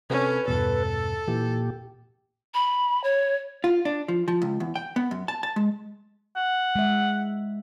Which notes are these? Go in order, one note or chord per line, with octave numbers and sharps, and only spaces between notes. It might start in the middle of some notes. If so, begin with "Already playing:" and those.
C3 C4 C#4 A4 B4
E2 G2 B2 A4
A#2 E3 G4
B5
C#5
F4
D4
F3
F3
C#2
E2
G5
B3
F#2
A5
A5
G#3
F#5
G#3 E5